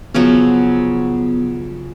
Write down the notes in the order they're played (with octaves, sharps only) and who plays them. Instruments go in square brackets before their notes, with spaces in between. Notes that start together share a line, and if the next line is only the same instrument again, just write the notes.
[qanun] C#3 F3 F#3 [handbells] B3